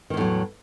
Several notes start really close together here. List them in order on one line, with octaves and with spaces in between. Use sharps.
D#3 E2 A2 F#3